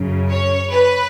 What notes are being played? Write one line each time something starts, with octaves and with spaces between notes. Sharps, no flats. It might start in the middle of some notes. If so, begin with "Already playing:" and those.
Already playing: F#2 C#3
C#5
B4